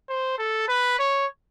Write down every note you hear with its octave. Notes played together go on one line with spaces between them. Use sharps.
C5
A4
B4
C#5